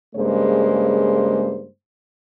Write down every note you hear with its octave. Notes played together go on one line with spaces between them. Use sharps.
G2 C#3 G#3 A#3 C5